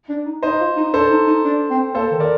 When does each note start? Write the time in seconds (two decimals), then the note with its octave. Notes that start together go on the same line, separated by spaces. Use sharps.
0.09 D4
0.26 D#4
0.43 D#4 C5 D#5
0.60 F4
0.77 D#4
0.93 D4 A4 C5
1.10 D#4
1.27 D#4
1.44 D4
1.70 C4
1.95 A#3 A4 C5
2.12 D#3
2.20 A#4 D5